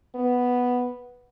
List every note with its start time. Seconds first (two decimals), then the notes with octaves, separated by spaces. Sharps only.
0.15 B3